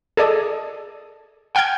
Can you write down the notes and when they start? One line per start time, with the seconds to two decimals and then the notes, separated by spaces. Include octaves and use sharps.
0.17 G#4 A4 D5 D#5
1.55 F#5 G5 F6 G6 G#6